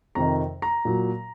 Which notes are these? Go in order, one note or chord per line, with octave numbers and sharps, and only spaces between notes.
F2 C3 D#3 A#5
A#5
A#2 F#3